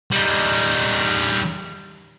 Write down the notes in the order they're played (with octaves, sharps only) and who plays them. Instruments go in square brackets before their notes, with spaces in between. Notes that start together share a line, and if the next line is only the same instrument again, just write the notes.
[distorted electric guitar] G3 D#4